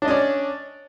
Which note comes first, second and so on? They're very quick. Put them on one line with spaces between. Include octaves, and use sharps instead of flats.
D4 D#5 C#4 D5